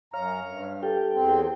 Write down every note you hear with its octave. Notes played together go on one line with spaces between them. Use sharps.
F#2 C#5 F5 A#5 F6
G2
G4 A4 G5
E2 C4